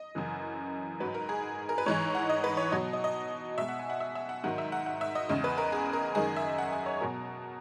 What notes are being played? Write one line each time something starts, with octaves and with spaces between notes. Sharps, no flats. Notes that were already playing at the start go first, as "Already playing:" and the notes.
Already playing: D#5
F#2 C#3 E3
G#2 F#3 B4
A#4
G#4
A#4
B4
G#2 E3 G#3 C#5
F#5
D#5
B4
C#5
B2 F#3 D#5
D#5
D#5
B2 G#3 E5
F#5
G#5
F#5
E5
E5
F#5
G#2 D#3 F#3 F#5
E5
F#5
F#5
E5
D#5
E2 C#3 G#3
B4
A#4
G#4
A#4
F#2 D#3 G#3 G#4
E5
F#5
G#5
C#5
B2 F#3 A#4